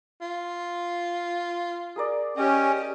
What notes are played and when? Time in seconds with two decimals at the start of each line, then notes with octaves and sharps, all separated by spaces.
0.21 F4
1.96 G#4 A#4 D5
2.37 C#4 G4 D#5